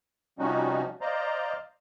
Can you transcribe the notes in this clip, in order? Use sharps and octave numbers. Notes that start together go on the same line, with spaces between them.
C3 F3 G3 C#4 D#4 F#4
C5 D5 D#5 F5 A#5